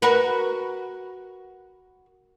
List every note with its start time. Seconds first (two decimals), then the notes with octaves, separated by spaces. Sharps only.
0.02 F#4 A#4 B4